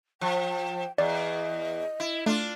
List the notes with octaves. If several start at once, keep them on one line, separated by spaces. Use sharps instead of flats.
F3 G5
E2 D5 D#5
E4
A3 D4 F4